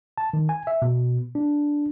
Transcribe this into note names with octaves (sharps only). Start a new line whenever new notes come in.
A5
D#3
G#5
E5
B2
D4